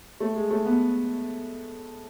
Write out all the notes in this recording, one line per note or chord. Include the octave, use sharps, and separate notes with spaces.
A3
G#3
A3
B3